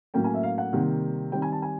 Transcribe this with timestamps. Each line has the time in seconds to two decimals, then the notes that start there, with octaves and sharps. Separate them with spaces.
0.14 A2 F#3 A#3 C#4 G5
0.24 G#5
0.34 E5
0.43 F5
0.58 F#5
0.73 C3 D#3 G3 A#3
1.32 D#3 G3 C4 G5
1.42 G#5
1.52 A5
1.62 G#5